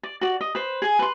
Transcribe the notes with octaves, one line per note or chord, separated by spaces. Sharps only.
D5
F#4 D5
D#5
B4 C5
G#4 G#5
B4 C6